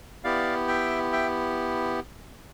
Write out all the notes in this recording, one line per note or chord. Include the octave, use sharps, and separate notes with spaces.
B3 E4 G4 D5 F5
E5 G5
E5 G5